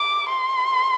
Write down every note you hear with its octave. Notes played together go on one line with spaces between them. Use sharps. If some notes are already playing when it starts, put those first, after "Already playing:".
Already playing: D6
C6